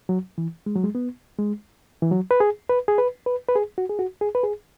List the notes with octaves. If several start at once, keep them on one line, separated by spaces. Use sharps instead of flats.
F#3
E3
G#3
F#3
G#3
B3
G#3
E3
F#3
B4
G#4
B4
G#4
B4
B4
B4
G#4
F#4
G#4
F#4
G#4
B4
G#4